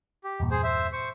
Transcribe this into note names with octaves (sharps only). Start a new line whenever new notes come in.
G4
E2 G2 A#2
G#4 C5
C5 E5
C5 C#6